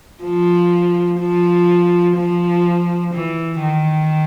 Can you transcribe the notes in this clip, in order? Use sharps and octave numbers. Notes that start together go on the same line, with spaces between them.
F3
F3
F3
E3
D#3